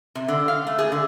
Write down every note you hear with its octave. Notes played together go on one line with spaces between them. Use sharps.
C3
D3
F5
A3
G#4
D3